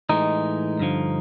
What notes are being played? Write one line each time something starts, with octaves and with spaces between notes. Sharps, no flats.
A2 E3 G#3 D#4
G2 D3 F3